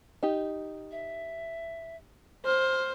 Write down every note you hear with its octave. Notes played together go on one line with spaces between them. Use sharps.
D#4 G4
E5
C5 F6